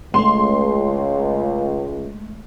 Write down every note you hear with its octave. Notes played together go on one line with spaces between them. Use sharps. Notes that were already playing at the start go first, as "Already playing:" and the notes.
C#2 G#3 A3 C6